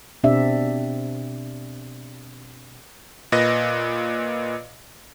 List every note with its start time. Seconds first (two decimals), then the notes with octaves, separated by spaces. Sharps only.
0.24 B2 C4 D4 G4 D5 E5
3.32 A#2 B4 D#5 A#6